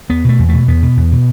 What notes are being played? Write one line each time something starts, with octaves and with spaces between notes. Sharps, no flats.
E2 B3
B2 A3
E2
B2 A3
E2 B3
B2
E2
B2